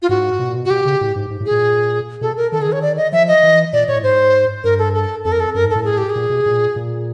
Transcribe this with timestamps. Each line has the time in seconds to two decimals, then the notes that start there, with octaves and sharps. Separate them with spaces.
0.02 F4
0.09 G#2 F#4
0.39 B2
0.49 A#2
0.55 B2
0.65 F#4
0.70 B2 G4
0.85 C#3
1.01 A2
1.16 G#2
1.30 G#2
1.40 A2
1.46 G#4
1.51 A#2
2.21 B2 A4
2.37 A#4
2.52 D#3 A4
2.59 D3 G#4
2.68 D#3 C#5
2.82 D5
2.97 D#5
3.12 F3 E5
3.28 D#5
3.43 E3
3.73 A#2 D5
3.88 A#2 C#5
3.96 A2
4.03 G#2 C5
4.64 G2 A#4
4.79 A4
4.94 A4
5.24 F2 A4
5.32 A#4
5.40 A4
5.55 F#2 A#4
5.64 G#2
5.70 A4
5.75 A2
5.85 G#4
5.98 G4
6.10 G#4
6.16 A#2
6.30 B2
6.46 A#2
6.76 A#2